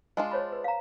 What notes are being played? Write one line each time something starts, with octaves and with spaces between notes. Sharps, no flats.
G#3 D4 F4
C5 C#5 B5
B4
F5 A#5